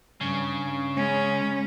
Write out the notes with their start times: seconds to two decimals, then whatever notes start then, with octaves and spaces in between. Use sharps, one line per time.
0.21 G2 C#3
0.96 G#3 C#4